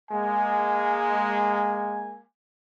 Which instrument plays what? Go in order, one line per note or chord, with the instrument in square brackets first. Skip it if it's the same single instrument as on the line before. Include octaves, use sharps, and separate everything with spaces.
[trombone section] G#3 A#3 [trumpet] G#5